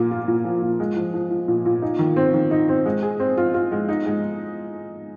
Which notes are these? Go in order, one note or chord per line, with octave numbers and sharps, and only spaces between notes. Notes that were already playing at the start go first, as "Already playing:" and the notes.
Already playing: A#2 A#3
F4
A#2
F3
A#2
G#3
F3
F3
F3
A#2
A#2
D#4
D#3
C4
D#3
D#4
C4
G#3
G#4
C4
F4
F4
G#3
D#4
G#3